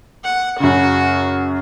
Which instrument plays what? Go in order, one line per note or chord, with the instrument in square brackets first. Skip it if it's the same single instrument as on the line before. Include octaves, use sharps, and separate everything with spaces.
[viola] F#5
[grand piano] F#2 C#3 [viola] F#4